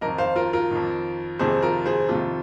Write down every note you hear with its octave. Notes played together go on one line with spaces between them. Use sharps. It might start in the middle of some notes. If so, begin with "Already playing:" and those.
F2 D#3 A#4 D#5
C5 F5
F4 A#4
F4 A#4
F2 D#3
F2 C3 D#3 G#4 C5
F4 A#4
G#4 C5
F2 C3 D#3 F4